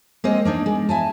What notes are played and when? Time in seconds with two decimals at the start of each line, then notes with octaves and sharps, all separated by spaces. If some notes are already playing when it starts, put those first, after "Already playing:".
0.24 G#3 A#3 C4 D#5
0.45 A#3 D4 D#4
0.66 G#3
0.89 E4 G#5 A5